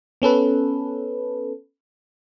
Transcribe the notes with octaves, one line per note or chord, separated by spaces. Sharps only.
B3 C#4 A4 B4